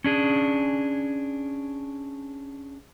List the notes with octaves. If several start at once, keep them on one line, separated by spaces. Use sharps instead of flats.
C#4 D4 G#4